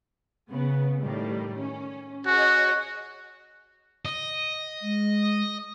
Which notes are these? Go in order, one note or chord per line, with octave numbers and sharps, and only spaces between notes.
C#3 B3
A2 D#3 G3
C#4
F#4 G#4 C#5 D#5
D#5
G#3